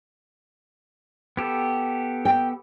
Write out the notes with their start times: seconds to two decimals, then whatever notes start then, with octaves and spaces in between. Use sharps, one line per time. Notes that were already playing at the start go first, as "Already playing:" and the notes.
1.37 B3 G4 A4
2.25 G5